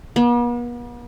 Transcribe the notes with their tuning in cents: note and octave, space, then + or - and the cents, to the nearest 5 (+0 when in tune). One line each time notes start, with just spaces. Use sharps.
B3 -45